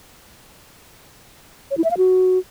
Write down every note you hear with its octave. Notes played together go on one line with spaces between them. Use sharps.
C#5
E4
E5
F5
F#4